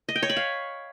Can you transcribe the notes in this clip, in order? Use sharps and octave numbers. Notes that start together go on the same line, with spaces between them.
D#5
G5
C#5
B5
F5